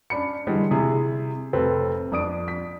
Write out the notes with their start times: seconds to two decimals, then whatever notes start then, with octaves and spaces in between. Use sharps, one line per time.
0.10 C#4 D4 B5 C#7
0.47 D3 E3 G3 G#3
0.71 C3 E4 G#4
1.53 F1 C4 A4 B4
2.12 F2 D4 D#6 D7
2.48 B6